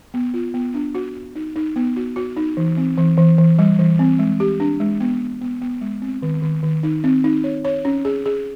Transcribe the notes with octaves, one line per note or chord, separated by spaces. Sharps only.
B3
F4
B3
D4
F#4
F#4
D#4
D#4
B3
F#4
F#4
D#4
E3
C4
E3
E3
E3
G3
E3
C4
G#3
G4
D4
G#3
B3
B3
B3
B3
G#3
C4
D#3
D#3
D#3
D#4
C4
D#4
C#5
C#5
C#4
G#4
G#4